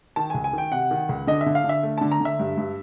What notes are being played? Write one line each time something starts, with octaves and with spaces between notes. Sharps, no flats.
D#3 A5
C#2 G#5
G#5
D#3 G5
C3 F#5
D#3
C#2
D3 D#5
E5
D3
F5
D3
E5
A3
D3 A5
A#5
D3 E5
G2
G2